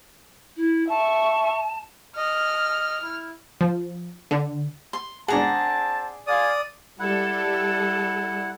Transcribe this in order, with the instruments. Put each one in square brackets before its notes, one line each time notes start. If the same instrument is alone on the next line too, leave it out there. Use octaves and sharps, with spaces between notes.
[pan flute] E4
[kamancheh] E5 C#6 [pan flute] A5
[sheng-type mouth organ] D#5 [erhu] F6
[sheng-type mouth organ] E4
[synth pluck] F3
D3
[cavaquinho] C6
[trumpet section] C4 A5 [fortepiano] D4 G#4 [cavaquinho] F#5 A#5
[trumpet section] F4 G#4 F5 [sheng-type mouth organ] D5 D#6
[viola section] G3 A4 [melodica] E4 F#5